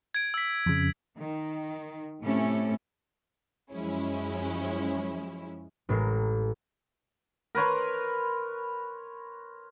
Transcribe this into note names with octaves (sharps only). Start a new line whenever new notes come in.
G#6 D7
E6 B6
F2 C#3
D#3
A2 C3 A3 C#4 E4 A4
F#2 F3 G#3 C#4 E4
A1 A2 G#3 A#4 C7
A#4 B4 C#5 C6